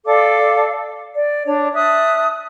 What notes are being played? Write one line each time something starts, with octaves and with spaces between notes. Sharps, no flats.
A4 D5 F5 D6
D5
D4 C#5
E5 A5 D#6 F#6